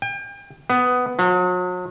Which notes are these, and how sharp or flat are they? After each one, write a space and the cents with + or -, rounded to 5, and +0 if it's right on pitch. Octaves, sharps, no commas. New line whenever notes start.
G5 +35
B3 +10
F#3 -40